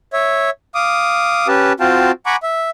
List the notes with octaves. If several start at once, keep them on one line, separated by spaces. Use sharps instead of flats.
C#5 E5
F5 D6 D#6
C#4 G4 B4 A5
C4 F4 F#4 F5 G5 A5
F#5 G#5 A#5 B5 C#6 D6
E5